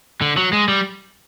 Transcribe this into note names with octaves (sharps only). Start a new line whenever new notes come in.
D3
F#3
G#3
G3